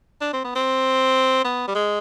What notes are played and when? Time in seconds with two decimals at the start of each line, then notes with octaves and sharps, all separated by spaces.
0.21 D4
0.33 C4
0.44 B3
0.55 C4
1.44 B3
1.68 G3
1.75 G#3